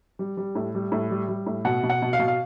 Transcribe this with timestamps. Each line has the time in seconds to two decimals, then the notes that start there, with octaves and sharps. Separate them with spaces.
0.19 G3
0.37 G3
0.55 A2
0.75 G3
0.92 A2
1.11 G3
1.28 G3
1.46 A2
1.65 B2 F#5
1.83 B2
1.90 F#5
2.02 B2
2.13 F5
2.19 B2
2.28 F5